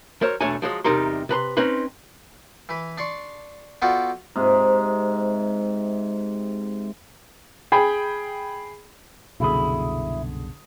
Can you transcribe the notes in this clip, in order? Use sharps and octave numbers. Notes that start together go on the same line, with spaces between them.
F#3 A#4 C5 C#5
B1 E2 A3 D4 C#5 G#5
F3 F#3 G#3
E2 C3 G3 D#4 A#4 C6
C3 B4 A#5 C6
C4 C#4 D#4 B4 C6
E3 B4
D4 D5 C6 C#6
B3 F4 F#4 A4 D5 G5
G#2 C3
G#4 G5 B5
C2 F#2 B2 D3 E4 G#4 D#6